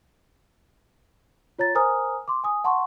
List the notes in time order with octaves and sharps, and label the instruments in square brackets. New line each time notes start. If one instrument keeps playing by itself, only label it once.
[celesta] F4 C#5 A#5 A6
A#4 C5 G#5 A#5 D#6 F6
C6 D6
G#5 D#6
F#5 A5 C6 C#6